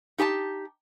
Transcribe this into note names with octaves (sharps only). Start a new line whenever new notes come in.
D#4 G4 G#5 A5